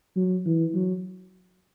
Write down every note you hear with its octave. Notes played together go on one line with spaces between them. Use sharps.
F#3
E3
F#3